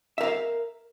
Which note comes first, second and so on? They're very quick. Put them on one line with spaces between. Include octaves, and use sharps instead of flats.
E5 A#4 F5